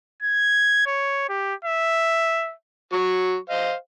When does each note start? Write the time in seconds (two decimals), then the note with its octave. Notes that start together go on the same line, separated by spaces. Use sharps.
0.23 G#6
0.87 C#5
1.29 G4
1.65 E5
2.92 F#3 C#6
3.50 C5 D#5 F5